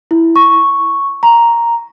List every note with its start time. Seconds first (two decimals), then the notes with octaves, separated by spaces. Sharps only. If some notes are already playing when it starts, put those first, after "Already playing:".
0.11 E4
0.36 C#6
1.23 A#5